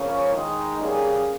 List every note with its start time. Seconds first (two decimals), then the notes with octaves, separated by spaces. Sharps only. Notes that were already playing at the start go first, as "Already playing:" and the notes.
Already playing: C#3 F3 A#3 C#4
0.30 D#3 G#3 D#4
0.79 G3 A#3 C#4 G#4